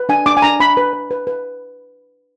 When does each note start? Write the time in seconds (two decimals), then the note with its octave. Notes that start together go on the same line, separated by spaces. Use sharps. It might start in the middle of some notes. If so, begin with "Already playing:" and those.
Already playing: B4
0.09 D4 G#5
0.26 D4 D6
0.37 G#5
0.42 D4 A#5
0.60 D4 B5
0.77 B4
0.93 B4
1.11 B4
1.27 B4